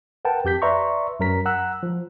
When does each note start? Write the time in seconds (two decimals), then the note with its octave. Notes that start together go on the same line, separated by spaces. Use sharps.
0.25 A#4 B4 F#5 G5 A5
0.45 F2 G4 G6 B6
0.62 B4 D5 E5 A#5 C6 C#6
1.20 F#2 F#3 A#4 A#5 B6
1.46 F#5 A#5 E6 F#6
1.83 F3